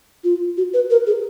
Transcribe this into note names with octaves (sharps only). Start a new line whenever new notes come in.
F4
F#4
B4
A#4
G#4